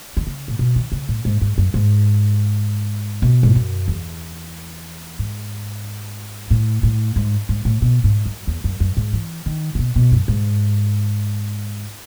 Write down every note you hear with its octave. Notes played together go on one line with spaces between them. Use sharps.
D#3
C#3
A2
B2
D#3
C#3
A2
G#2
G#2
F#2
G#2
B2
G#2
F#2
E2
G#2
A2
A2
G#2
G#2
A2
B2
G#2
F#2
E2
F#2
F#2
G#2
E3
D#3
C#3
B2
B2
F#2
G#2